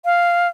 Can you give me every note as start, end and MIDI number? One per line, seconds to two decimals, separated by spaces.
0.05 0.48 77